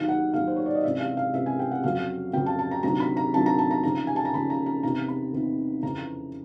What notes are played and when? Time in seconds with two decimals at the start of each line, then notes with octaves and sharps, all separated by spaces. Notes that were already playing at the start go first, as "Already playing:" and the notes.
Already playing: D#2 D#3 F#3 F5
0.08 F#5
0.33 D#2 D#3 F#3 F5
0.47 C5
0.56 C#5
0.66 D5
0.75 D#5
0.84 C#2 C3 E3 E5
1.01 F5
1.17 F5
1.34 C#2 C3 E3 E5
1.46 G#5
1.59 G5
1.71 F#5
1.84 F2 C#3 F#3 F5
2.33 F2 C#3 F#3 G5
2.46 A5
2.59 A5
2.71 A#5
2.83 D2 C3 D#3 F#3 A#5
3.00 B5
3.17 A#5
3.33 D2 C3 D#3 F#3 A5
3.46 A#5
3.59 A5
3.71 A#5
3.83 D#2 C#3 F3 A#5
4.07 G#5
4.16 A5
4.25 A#5
4.33 D#2 C#3 F3 B5
4.50 A#5
4.66 A#5
4.83 E2 C3 D#3 A#5
5.08 B5
5.33 E2 C3 D#3
5.83 F2 C#3 E3 A#5